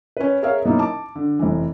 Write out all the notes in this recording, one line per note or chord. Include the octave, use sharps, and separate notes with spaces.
C#4 B4
G#4 A#4 C#5 E5 F5
B2 F#3 A#3 D#4 E4
A5 D6
D3
F1 E3